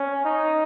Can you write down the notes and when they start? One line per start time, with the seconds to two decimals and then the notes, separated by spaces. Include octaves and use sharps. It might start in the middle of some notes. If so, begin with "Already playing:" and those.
Already playing: C#4
0.25 D#4